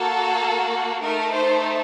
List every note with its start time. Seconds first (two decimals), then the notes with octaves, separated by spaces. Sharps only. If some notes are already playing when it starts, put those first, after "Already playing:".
Already playing: A#3 F#4 A4
1.02 A3 D#4 A4 A#4
1.34 C5